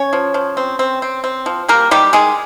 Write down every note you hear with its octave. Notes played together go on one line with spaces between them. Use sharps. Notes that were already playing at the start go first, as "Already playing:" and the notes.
Already playing: C#4 C#5
F3
F3
C4
C4
C4
C4
F3
G3 A#3 A#4
D#3 G3 G4
D#3 G#3 G#4